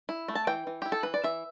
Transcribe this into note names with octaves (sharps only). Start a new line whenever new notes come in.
E4
A3
A5
E3 G5
E3
E4 G4
A4
E3 B4
D5
E3 E5